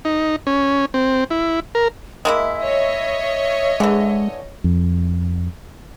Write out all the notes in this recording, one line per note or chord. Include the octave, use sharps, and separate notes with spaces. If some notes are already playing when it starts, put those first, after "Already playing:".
D#4
C#4
C4
E4
A#4
G#3 A#3 E4 E5
C#5 D#5
D3 E3 G#3
F2